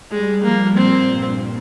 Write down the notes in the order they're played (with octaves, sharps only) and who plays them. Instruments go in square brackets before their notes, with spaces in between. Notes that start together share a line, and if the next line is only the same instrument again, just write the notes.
[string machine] G3 [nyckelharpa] G#3
[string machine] F3 [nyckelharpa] A#3
[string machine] A#2 [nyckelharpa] C4
[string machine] G2